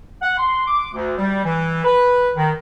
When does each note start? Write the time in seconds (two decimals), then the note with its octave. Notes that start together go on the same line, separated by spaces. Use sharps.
0.22 F#5
0.38 C6
0.67 D6
0.94 D2
1.18 G3
1.44 E3
1.85 B4
2.36 D#3